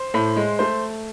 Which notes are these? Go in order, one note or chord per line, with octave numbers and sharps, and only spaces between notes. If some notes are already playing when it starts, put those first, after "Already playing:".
Already playing: C5
A2
G#3
A3 C5